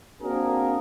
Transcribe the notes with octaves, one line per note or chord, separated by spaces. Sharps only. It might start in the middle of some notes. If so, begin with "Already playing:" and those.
A#3 C4 D4 F#4 G#4 A#4